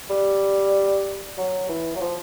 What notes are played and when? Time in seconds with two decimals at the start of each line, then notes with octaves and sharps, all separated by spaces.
0.10 G3
1.38 F#3
1.69 E3
1.96 F#3
2.01 F3